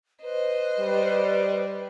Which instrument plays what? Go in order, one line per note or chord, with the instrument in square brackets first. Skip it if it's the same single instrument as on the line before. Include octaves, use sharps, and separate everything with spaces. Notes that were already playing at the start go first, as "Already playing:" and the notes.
[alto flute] B4 [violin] C5 D#5
[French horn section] G3